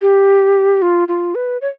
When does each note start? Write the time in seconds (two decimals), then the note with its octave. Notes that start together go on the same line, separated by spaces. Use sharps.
0.02 G4
0.82 F4
1.08 F4
1.35 B4
1.62 C#5